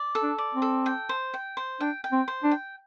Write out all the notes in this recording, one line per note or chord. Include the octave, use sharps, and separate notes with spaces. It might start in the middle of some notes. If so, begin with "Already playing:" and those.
Already playing: D5
A4
D4
D5
C4
A4
G5
C5
G5
C5
D4 G5
G5
C4
C5
D4
G5